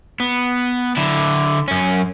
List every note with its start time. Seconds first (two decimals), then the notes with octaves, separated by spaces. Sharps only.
0.20 B3
0.97 D3 E4
1.68 F#2 C#4